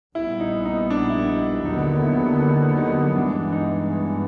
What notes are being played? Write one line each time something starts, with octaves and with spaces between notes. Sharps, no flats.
A#1 A#2 G3 B3 E4
D#4
D#4
D4
E4
D#4
D#2 D3 F#3 B3 D#4
E4
D#4
D#4
G2 E3 G#3 B3 D4
D#4